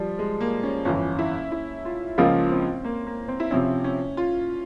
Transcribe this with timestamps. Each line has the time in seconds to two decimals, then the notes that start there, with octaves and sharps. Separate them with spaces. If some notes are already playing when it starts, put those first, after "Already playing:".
Already playing: F3 G3
0.19 G#3
0.41 A#3
0.63 C#4
0.85 G1 F2 E3 C#4
1.19 E4
1.52 E4
1.85 F4
2.18 C#2 C#3 F3 A#3 C#4 F4
2.51 C4
2.85 A#3
3.07 A#3
3.28 C4
3.40 E4
3.51 C3 F3 C4 C#4 E4
3.84 C#4
4.17 F4